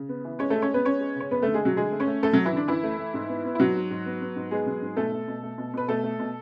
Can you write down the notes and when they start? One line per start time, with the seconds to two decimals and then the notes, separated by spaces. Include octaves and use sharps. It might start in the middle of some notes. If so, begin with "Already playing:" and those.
Already playing: C#3
0.09 B3
0.25 E3
0.39 G#3 C#4 C#5
0.50 G#3 A3 A4
0.62 C#4 C#5
0.70 G#3 B3 B4
0.85 B3 C#4 C#5
1.00 G#3
1.15 C#3 C#5
1.31 F#2 B3 B4
1.42 D3 A3 A4
1.54 G#3 G#4
1.61 F#3 A3 F#4
1.77 D3 G#3 G#4
1.92 A3
2.00 C#4 C#5
2.07 A3
2.23 F#2 A3 A4
2.33 F#2 F#3 F#4
2.45 E3 E4
2.52 D3 D4
2.68 F#2 E3 E4
2.83 A3
2.98 A3
3.14 G#2
3.29 B3
3.44 B3
3.55 E4
3.60 G#2 F#3 F#4
3.75 G#2
3.90 G#2
4.06 B3
4.21 B3
4.36 G#2
4.51 G#3 B3 G#4
4.66 F#3
4.82 G#2
4.96 B2 A3 A4
5.12 A3
5.28 B2
5.43 A3
5.58 B2
5.74 B2 B4
5.88 B2 A3 A4
6.04 A3
6.19 B2